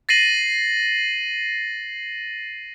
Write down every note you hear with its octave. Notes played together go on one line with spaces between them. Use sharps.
A6 A#6 C7 D#7 F#7